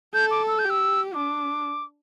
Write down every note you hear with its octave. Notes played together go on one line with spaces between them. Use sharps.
A4 G6
D6
E6
G6
G4
E6
D4 D6